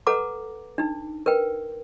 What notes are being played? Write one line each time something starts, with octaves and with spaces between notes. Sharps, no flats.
A4 B4 F#5 A#5 D6
D4 D#4
A#4 B4 G5